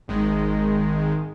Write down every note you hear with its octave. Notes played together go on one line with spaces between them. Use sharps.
G#1 D#3 G#3